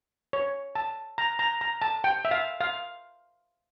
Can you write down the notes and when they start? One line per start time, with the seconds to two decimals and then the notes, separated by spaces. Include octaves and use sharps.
0.33 C#5
0.75 A5
1.18 A#5
1.39 A#5
1.61 A#5
1.82 A5
2.04 G5
2.25 E5
2.31 F5
2.61 F5